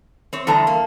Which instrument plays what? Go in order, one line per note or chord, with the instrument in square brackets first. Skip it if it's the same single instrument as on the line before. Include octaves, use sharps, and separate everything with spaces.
[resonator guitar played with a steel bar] C4 C#5
[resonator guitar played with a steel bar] E2 G2 D3 [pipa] A4 A5 A#5
[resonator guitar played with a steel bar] A#3